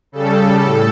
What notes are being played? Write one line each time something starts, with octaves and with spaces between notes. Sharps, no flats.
C#3 G3 A4
A2